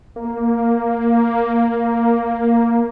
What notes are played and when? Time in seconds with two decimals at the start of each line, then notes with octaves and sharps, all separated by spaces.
0.16 A#3